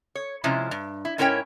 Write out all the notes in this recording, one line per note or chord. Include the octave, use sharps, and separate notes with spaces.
C#5
C3 F3 G#3 C#4 E4
G2
E4
G#2 C#4 E4 A#4 C#5 G5